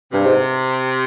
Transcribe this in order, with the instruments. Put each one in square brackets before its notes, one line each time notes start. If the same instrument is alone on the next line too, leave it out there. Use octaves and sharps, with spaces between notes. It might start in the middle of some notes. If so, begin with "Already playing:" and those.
[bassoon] G2 [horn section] C3
[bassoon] G#2